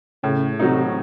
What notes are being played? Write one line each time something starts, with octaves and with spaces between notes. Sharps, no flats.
A2 C#3
C3 F#3 A3 D#4